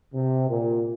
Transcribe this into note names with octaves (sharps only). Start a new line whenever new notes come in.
C3
A#2